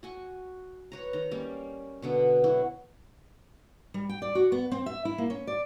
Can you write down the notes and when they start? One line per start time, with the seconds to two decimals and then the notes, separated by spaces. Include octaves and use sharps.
0.03 F#4 G#5 C#6
0.92 B4 C#5 A#5
1.13 D#3 A#5
1.31 G3 A#3 C#4
2.02 B2 D3 B3
2.44 F#3 E4 F#4
3.94 G3
4.09 G5
4.22 D5
4.35 F#4
4.52 B3
4.71 C4
4.86 E5
5.05 E4
5.18 A#3
5.30 C#4
5.47 D5